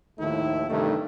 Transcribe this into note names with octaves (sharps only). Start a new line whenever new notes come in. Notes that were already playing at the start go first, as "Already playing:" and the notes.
D#2 A2 D#3 F3 A3 E4
G2 C3 D#3 E3 A3